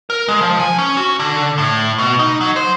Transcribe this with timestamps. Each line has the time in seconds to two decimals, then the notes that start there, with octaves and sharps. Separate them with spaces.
0.10 A#4
0.28 G#3
0.41 F3
0.60 G#5
0.78 C#4
0.97 F#4
1.19 D3
1.58 A2
1.98 B2
2.19 D#4
2.41 F#3
2.56 C5